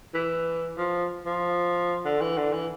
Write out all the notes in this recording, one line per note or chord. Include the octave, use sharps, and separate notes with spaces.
E3
F3
F3
D3
E3
D3
E3